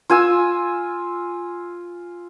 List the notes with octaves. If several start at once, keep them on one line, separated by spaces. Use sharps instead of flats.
F4 G#5 E6